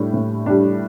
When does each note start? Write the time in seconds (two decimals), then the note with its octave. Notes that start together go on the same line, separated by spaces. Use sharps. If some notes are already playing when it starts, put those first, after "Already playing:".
Already playing: A2 G3 D4
0.14 A2
0.46 G3 D4